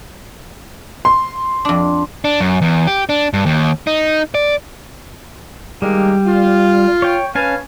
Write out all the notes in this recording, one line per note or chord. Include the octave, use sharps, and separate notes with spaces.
C6
F2 D4
D4
F#2
E2
G4
D4
G2
D#2
D#4
D5
D#3 G3 G#3 A#3
F4
C#5 G5
C#4 B4 F5 G#5 A5